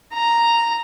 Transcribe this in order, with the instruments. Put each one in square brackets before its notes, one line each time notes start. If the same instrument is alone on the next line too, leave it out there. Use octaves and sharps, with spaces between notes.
[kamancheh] A#5